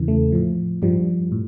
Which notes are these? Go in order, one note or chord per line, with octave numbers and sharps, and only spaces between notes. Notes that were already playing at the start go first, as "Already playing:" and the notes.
Already playing: E2 C#3 E3
A3
A2 F3
G2 F3 G3
A2